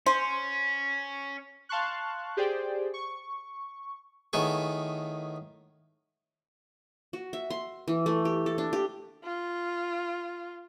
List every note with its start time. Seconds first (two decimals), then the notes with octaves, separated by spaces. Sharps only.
0.06 C#4 C5
1.69 F5 A5 C6 C#6 F#6
2.37 G4 G#4 C5 D5 G5
2.94 C#6
4.33 A2 D#3 B3 G#4 C#6
7.13 F#4
7.33 E5
7.50 C6
7.88 E3
8.06 A3
8.25 G4
8.46 A4
8.58 D4
8.73 G4
9.24 F4